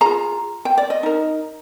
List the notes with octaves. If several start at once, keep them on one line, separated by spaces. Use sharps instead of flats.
F4 G#4 A#5
G5
D5
D#5
D#4 A#4